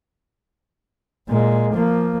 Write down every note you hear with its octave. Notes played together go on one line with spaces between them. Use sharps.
A#2 G#3
F3 A#3